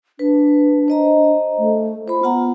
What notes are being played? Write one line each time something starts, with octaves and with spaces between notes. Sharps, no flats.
D4 B4
C5 D#5 A#5
A3
F4 C5 B5
B3 F4 F#5 A#5